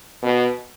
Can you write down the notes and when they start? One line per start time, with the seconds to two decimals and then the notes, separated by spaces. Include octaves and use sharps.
0.22 B2